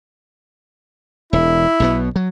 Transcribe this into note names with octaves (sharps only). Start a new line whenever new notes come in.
E1 E4
B1 B2 B3
F#3